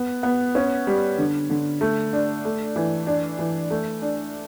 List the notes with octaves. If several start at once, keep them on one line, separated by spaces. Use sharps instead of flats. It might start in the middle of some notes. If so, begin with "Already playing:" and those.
Already playing: B3
B3
C#4
G3
D3
D3
A3
D4
A3
E3
D4
E3
A3
D4